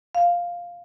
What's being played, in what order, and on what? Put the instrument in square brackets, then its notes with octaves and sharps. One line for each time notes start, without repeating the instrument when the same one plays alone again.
[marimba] F5